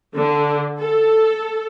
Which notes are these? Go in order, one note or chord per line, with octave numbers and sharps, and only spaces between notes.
D3
A4